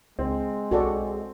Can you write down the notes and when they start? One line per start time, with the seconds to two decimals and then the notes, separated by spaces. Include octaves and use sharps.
0.19 C#2 G#3 C4
0.71 B1 F#4 A4 D5